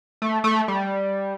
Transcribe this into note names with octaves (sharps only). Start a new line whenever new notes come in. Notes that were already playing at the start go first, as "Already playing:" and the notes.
A3
A3
G3